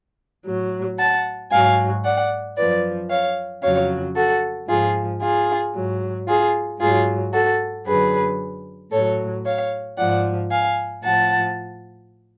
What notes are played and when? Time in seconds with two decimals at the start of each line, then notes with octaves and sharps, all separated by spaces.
0.45 A2 F#3
0.98 F#5 A5
1.51 G#2 F#3 F5 G#5
2.04 D5 F#5
2.57 F#2 F3 B4 D5
3.10 C#5 F5
3.62 F2 C#3 F#3 C#5 F5
4.16 F#4 A4
4.69 G#2 F3 F4 G#4
5.21 F4 G#4
5.74 G#2 F#3
6.27 F4 G#4
6.80 G#2 F#3 F4 G#4
7.33 F#4 A4
7.86 F#2 D3 F#3 G#4 B4
8.92 A2 F#3 A4 C#5
9.45 C#5 F5
9.97 G#2 F3 D5 F#5
10.50 F5 G#5
11.03 A2 F3 F#5 A5